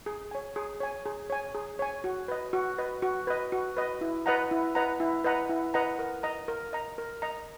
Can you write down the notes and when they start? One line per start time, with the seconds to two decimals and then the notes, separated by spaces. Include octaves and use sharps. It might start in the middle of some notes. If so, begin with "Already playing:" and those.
0.06 G#4
0.31 C#5 G#5
0.56 G#4
0.80 C#5 G#5
1.06 G#4
1.30 C#5 G#5
1.55 G#4
1.79 C#5 G#5
2.04 F#4
2.28 B4 D#5
2.53 F#4
2.78 B4 D#5
3.02 F#4
3.27 B4 D#5
3.52 F#4
3.77 B4 D#5
4.01 E4
4.26 B4 D#5 F#5 A#5
4.51 E4
4.75 B4 D#5 F#5 A#5
5.00 E4
5.24 B4 D#5 F#5 A#5
5.49 E4
5.74 B4 D#5 F#5 A#5
5.99 A#4
6.23 D#5 A#5
6.48 A#4
6.73 D#5 A#5
6.98 A#4
7.22 D#5 A#5